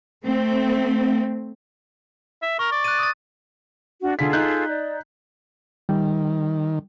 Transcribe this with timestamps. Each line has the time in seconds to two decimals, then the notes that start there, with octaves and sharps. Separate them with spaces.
0.25 A3 C4
2.42 E5
2.59 A#4 C#6
2.72 D5
2.84 F#6 A6 D#7
2.99 D#6 A6
4.01 D4 F#4
4.19 D3 F4 G#4 A4 B6
4.33 D#4 F#6 G6
4.67 D5
5.89 D#3 G3